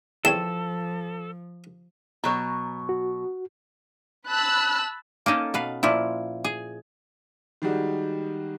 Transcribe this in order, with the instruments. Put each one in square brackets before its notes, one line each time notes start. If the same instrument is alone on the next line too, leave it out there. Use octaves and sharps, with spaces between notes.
[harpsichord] E2 C4 C#5 [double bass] F3 [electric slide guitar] A4 [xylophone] E7
[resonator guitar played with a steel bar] B2 F#3 C#5 [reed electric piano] A#5
[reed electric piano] F#4
[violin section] A5 B5 E6 F#6
[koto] A#3 C#4 D#4 A4
B2 B4 F5
A#2 F3 E4
G#4
[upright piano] D#3 G3 G#3 F#4